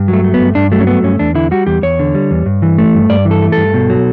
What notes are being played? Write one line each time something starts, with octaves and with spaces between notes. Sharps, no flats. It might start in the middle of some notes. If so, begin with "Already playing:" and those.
Already playing: G2
F#3
A3
A3
B3
G2
G2 D4
F#3 A3
C#4
A3 B3
G2 C#4
E2 D4
D3 E4
G3 F#4
E2 G4
E2 C#5
D3
G3
E2
G2
E3
A3
G2
G2 D5
E3
A4
A3
G2 A4
B2
F#3